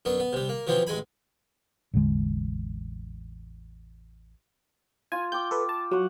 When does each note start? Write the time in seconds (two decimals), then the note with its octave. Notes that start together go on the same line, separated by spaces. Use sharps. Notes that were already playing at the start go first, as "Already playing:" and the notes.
0.05 F#2 B3 D4
0.20 B3
0.33 C3 G3
0.49 A#3
0.67 B2 E3 F3 B3 C4
0.87 A1 G#3 G#5 B5
1.94 A1 E2 D3 G#3
5.12 F4 G#5
5.32 G5 D6 G6
5.51 A4 B4
5.69 A5
5.91 F#3 F#5 C#6